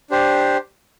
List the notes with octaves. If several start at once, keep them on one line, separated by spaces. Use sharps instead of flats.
D4 G4 C5